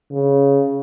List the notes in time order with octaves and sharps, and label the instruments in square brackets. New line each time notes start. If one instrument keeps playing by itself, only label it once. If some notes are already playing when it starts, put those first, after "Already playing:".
[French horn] C#3